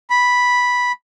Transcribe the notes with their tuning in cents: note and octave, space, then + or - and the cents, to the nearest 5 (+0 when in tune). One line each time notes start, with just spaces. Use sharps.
B5 -5